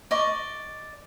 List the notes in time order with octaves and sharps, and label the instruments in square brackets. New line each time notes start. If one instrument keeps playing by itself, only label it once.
[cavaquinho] D5 D#5 C#6